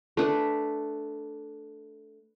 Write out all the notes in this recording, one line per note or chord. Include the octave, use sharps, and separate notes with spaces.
A3 D4 B4